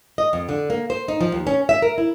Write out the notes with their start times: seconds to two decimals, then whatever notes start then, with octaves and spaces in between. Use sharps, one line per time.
0.18 D#5
0.33 F2
0.49 D3
0.70 A#3
0.90 C5
1.08 D#4
1.21 F3
1.32 D#2
1.47 C#4
1.69 E5
1.82 A#4
1.98 E4